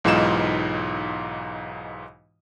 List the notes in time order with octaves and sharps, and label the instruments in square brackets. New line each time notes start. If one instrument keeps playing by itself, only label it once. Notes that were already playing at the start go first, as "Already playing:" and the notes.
[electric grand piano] B1 G#2 E3 D#4 F4 E7